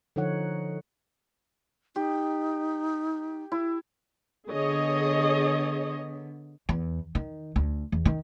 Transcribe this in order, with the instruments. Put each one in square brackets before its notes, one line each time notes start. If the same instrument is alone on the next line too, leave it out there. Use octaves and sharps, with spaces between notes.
[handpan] D3 F3 D#4 C#5 F#5
[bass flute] D#4 [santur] G4
[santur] E4
[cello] D3 B3 [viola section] G#4 C#5 D#5
[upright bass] E2
D#3
D2
E2
D#3